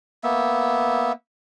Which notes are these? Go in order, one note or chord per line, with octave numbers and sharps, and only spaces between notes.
A#3 B3 E5